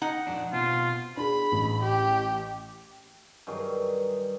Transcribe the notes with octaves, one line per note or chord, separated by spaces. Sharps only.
D#4 F#5
F2 D4
B2 C4 F4
D4 G#4 B5
A1
G4
G2 D#3 F#3 G#4